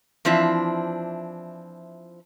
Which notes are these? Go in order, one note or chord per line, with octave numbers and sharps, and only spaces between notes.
E3 F3 C4 D4 E4 E5